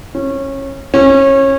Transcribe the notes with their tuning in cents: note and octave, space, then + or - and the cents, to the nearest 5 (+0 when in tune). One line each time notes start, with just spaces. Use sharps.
C#4 -20
C#4 -25